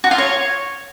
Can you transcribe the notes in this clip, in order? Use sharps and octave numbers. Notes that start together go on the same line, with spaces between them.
F#4
F4
C#5